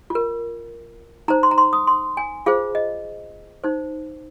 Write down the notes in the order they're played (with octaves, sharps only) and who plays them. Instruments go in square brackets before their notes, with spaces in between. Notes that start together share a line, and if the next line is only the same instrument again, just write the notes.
[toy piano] F4
A#4
D#4 C5 A#5
C6
A#5
C6
D#6
C6
G#5
F4 G#4 C5 F5
D#5
D#4 C5